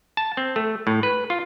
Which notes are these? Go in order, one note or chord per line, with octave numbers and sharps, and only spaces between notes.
A5
C4
A3
A2
B4
F4